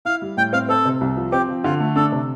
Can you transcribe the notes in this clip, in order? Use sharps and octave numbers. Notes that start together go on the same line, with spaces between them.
E4 F5
G3
A2 G5
C4 F5
C4 A4
C3
C2
F3
C4 G4
F3
D3 F4
A3
D4 A4
C3